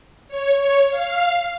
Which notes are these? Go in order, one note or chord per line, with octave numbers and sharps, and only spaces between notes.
C#5
C#5
F5